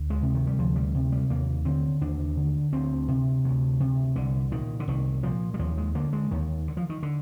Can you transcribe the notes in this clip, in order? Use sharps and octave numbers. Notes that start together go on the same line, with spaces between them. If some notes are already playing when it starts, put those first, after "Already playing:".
Already playing: D2
G#3
C3
D#3
G3
D2 F3
G3
C3
G3
D#2 A#3
D3 C4
D#2 D4
D3
D2 C4
C3
D2
C3
C2 D3
A#2 D#3
D3
C2 D#3
A#2 F3
G3
D#2 F3
G#3
D3 A#3
G#3
D#2 D#3
D3
F3
D#3
D3